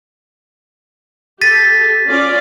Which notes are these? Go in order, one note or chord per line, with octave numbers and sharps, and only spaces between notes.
G4 A4 A6 B6 D#7
C#4 F4 D5